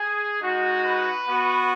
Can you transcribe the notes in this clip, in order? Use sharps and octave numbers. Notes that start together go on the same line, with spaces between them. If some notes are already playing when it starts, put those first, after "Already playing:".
Already playing: G#4
G#3 D#4 F#4
B4
B3 F#4